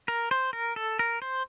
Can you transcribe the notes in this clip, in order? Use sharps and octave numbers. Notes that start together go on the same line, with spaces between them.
A#4
C5
A#4
A4
A#4
C5